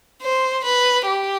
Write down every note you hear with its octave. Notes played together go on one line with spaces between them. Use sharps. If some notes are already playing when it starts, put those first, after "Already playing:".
C5
B4
G4